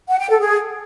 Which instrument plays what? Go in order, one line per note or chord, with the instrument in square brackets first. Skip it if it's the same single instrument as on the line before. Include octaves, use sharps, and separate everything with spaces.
[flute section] F#5
G5
A4
G#4